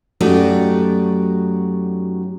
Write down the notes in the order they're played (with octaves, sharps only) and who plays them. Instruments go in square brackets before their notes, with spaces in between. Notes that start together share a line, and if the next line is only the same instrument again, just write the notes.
[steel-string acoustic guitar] F#2 A3 D#4 F#4 G4 D5